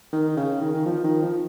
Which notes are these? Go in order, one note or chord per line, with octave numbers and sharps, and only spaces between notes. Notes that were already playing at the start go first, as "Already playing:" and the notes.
D#3
C#3
D#3
D#3
F3
D#3
F3